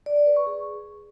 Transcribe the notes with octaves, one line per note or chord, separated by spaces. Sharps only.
D5
D5
B4
C#6
G#4